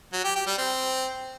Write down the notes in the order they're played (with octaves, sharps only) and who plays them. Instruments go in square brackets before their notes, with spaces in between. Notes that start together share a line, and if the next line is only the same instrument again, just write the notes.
[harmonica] F#3
G4
G4
G3
C4